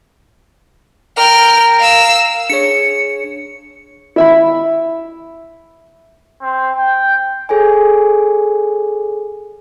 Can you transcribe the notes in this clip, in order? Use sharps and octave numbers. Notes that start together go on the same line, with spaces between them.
A#4 G5 F6
F5 E6
D4 G#4 C#5 C#7
E4 E5 B5
C4
G5
G#4 A4 C#5 G#5